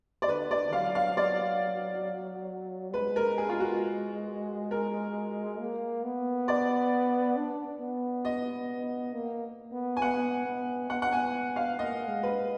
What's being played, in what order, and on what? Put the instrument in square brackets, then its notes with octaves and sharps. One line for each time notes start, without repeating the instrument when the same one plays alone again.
[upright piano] D5
[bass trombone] D3 [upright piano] B4
[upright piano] D5
[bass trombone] F#3 [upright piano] F5
[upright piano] F5
D5
[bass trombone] G#3 [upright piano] B4
[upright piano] A#4
G#4
F4
F#4
A#4
[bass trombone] A#3
B3
[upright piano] D5
[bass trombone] D4
B3
[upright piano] D#5
[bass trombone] A#3
B3
[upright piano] G#5
[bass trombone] B3 [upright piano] F#5
[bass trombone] B3
[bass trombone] B3 [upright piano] F#5
[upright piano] F#5
G#5
F5
[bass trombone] A#3 [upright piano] D#5
[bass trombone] G#3
[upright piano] B4